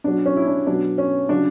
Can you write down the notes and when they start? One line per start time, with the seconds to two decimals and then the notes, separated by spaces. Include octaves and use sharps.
0.04 B2 F#3 D4
0.26 C#4
0.37 E4
0.47 D4
0.67 B2 F#3 D4
0.98 C#4
1.29 C#3 F#3 D4